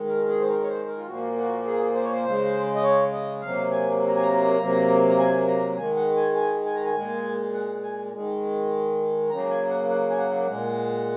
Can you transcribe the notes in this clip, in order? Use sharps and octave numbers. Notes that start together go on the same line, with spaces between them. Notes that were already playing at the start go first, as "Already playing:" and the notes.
Already playing: D#3 G#3
A#4
G#4
C5
A#4
C#5
C5
A#4
F4
A#2 F3 A#3 F#4
F#4
G#4
C5
C#5
C5
C#3 G#3
D#5
C#5
D#5
C3 F#3 A#3 F5
G#5
A#5
G#5
A#5
C3 F#3 A#3
A#5
G#5
A#5
D#3 G#3 G#5
F#5
G#5
G#5
G#5
A#5
G#5
A#2 G#3
F#5
G#5
D#3 G#3
C#3 F#3 A#3 A#5
G#5
F#5
F#5
G#5
F#5
A#2 G#3